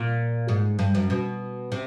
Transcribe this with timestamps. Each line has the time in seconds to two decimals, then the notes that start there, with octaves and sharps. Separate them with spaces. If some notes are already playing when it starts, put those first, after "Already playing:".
Already playing: A#2
0.48 G#2
0.79 G2
0.95 F#2
1.10 B2
1.72 C3